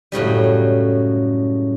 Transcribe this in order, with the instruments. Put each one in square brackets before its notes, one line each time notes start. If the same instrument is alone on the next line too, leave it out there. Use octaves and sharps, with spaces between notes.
[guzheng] F#2 A2 C#3 G3